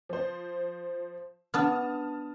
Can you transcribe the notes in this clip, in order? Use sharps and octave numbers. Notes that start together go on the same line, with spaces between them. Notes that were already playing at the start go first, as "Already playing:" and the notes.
F3 C5
B3 D4 A5 D#6 F6